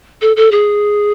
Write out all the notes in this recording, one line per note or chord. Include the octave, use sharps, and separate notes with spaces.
A4
A4
G#4